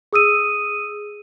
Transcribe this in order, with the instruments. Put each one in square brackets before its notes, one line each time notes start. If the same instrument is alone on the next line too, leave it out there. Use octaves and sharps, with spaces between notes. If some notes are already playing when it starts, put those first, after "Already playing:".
[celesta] G#4 D#6 E6 D#7